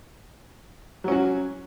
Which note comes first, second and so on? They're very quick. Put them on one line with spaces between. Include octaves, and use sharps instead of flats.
F#3 C#4 F#4